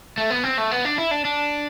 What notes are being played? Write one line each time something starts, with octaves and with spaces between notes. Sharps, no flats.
A3
B3
C4
A3
B3
D4
E4
D4
D4